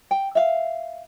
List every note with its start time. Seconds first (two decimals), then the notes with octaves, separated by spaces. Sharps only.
0.11 G5
0.35 E5 F5